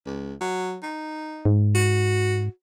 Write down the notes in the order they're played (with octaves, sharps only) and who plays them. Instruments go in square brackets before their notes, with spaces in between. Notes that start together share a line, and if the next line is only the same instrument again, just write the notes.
[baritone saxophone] C#2
F#3
D#4
[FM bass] G#2
[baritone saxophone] F#4